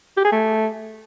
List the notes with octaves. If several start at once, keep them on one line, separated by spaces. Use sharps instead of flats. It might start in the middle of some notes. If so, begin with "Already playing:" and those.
G4
G#4
A3